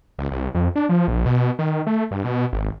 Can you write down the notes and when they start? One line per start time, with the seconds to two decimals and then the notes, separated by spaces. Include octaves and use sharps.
0.19 C#2
0.32 C2
0.55 F2
0.75 D4
0.89 F3
1.08 A#1
1.26 B2
1.59 D#3
1.87 A3
2.11 G2
2.24 B2
2.53 G#1